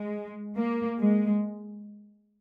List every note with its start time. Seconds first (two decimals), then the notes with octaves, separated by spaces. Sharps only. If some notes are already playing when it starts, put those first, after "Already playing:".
Already playing: G#3
0.55 A#3
0.99 G#3